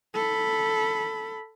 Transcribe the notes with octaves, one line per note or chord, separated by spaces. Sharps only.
A4 B5